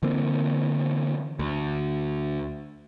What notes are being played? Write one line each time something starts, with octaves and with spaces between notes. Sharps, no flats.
D3 E3 A#3 C4
D2